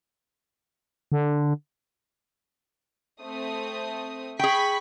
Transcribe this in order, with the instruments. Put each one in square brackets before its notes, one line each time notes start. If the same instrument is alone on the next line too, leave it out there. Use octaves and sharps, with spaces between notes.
[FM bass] D3
[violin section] A3 C4 D#6
[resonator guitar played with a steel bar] G#4 G5 [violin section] B5 C#6 B6